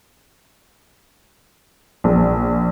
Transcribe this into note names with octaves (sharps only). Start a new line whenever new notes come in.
A#1